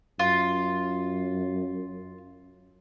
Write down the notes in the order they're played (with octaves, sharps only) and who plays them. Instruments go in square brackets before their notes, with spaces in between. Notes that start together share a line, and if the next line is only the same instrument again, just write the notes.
[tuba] F#2 [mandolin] F4